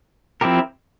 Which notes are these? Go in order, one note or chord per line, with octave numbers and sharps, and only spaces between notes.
F3 C4 E4 G4 A#4